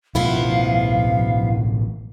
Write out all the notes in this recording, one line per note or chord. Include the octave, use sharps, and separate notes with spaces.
A1 B2 F3 A3 B3 E4 F5